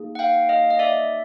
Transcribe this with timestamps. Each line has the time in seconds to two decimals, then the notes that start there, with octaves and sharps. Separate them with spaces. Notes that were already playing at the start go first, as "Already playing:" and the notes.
Already playing: A#3 D#4 G#4
0.15 F#5
0.19 F5 G5
0.49 D#5 F5
0.70 D#5
0.79 D5 E5